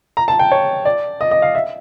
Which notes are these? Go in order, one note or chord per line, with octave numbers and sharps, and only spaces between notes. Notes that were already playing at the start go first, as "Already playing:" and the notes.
A#5
A5
G5
C#5
D5
D#5
D#5
F5
E5